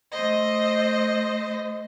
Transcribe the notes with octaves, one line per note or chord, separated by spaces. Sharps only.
A3 C5 D#5